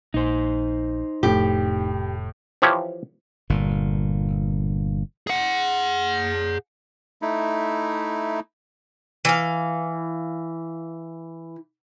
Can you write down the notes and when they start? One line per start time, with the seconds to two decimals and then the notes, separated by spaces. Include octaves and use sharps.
0.14 A#1 D#4 C5
1.23 F1 A2 G4
2.62 E3 F3 G4 C#5
3.50 G1 A#2
5.27 G#4 F#5
7.22 A3 D#4 E4
9.25 E3 F5